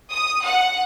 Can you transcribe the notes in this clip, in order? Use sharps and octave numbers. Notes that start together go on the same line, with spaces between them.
D#6
F#5